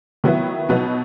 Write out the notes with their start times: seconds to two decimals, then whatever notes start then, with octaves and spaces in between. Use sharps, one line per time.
0.24 D#3 F#3 B3 E4
0.69 B2 F#3 B3 D#4